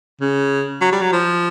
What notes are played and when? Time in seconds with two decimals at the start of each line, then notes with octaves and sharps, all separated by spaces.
0.21 C#3
0.81 F#3
0.92 G3
1.02 F#3
1.12 F3